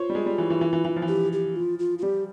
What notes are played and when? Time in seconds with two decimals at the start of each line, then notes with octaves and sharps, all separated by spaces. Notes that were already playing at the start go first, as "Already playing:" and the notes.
Already playing: F4 C5 C#5
0.09 G3
0.15 G#3
0.26 G3
0.38 E3
0.50 E3
0.61 E3
0.73 E3
0.85 E3
0.96 F3
1.02 E3
1.08 F3 G4
1.33 G4
1.56 F4
1.79 F4
1.99 F4
2.03 G3 G4